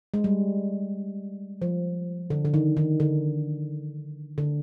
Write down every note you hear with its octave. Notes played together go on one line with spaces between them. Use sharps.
G#3
G3
F3
D3
D3
D#3
D#3
D3
D3